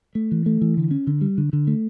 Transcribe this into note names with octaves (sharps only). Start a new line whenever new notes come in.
A3
E3
A3
E3
D3
C#4
D3
G3
D3
D3
A3